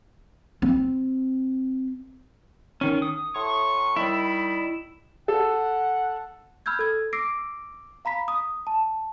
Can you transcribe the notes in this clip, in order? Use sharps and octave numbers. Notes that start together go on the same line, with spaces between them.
C4
D#3 C#4
D#6
A2 C6 C#6
D#3 G3 E4 B5
A4 F#5
B5 E6 F6 G6 G#6
A4 G#6
D6 E6 A#6 C7 D7
F5 A#5 B5 B6
D#6
A5